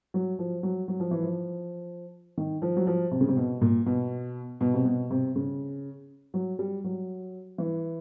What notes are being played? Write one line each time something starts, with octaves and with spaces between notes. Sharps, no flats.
F#3
F3
F#3
F#3
F3
E3
F3
D#3
F3
F#3
F3
C3
C#3
C3
B2
A#2
B2
B2
C3
B2
C3
C#3
F#3
G3
F#3
E3